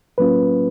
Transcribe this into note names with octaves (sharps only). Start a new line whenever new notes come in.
A2 F#3 A#3 C#4 F4 B4